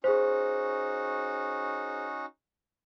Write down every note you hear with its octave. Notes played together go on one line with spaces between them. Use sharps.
C#4 D#4 F#4 G#4 C5